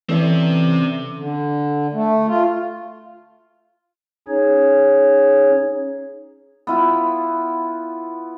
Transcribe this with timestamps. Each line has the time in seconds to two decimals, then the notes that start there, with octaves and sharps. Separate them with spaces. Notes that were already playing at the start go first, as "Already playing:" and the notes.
0.09 E3 C4 C#4 A4 D5 E5
1.16 D3
1.93 A3
2.26 F4
4.28 C#4 D#4 G#4 C#5
6.67 B3 E4 F4